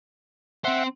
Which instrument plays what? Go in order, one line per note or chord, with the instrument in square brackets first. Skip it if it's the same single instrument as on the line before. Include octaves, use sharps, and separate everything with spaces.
[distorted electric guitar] C4 C5 [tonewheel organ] E5 F#5